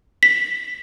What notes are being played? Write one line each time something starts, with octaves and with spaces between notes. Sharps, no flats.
B6